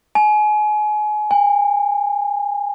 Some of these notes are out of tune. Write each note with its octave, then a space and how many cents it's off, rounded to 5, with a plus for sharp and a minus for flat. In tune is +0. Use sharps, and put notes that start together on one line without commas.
G#5 +30
G#5 -40